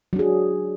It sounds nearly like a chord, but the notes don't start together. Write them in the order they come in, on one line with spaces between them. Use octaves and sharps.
F#3 D4 G#4